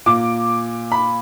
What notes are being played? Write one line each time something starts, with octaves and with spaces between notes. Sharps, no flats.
A#2 D6
B5